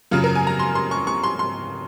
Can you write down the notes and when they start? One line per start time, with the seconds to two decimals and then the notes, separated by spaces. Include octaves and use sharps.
0.11 F#2 C#3 F#3 F4
0.24 A#4
0.35 G#5
0.47 A#5
0.59 C6
0.75 C6
0.91 C#6
1.07 C#6
1.24 C6
1.39 C6